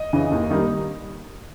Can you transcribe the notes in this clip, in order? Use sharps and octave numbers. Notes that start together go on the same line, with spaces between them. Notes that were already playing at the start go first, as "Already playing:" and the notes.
Already playing: D#5
C#3 E3
D#2
D#3 G3 A#3 D#4